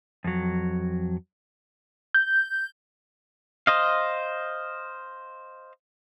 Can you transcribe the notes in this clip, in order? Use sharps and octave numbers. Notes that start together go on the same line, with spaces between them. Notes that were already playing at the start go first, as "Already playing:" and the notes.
F2 F#3
G6
C5 D#5 F5